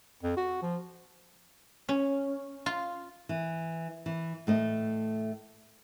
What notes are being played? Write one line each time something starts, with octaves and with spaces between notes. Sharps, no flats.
F2
F#4
F3
C#4
F4
E3
E3
A2 A3 D#5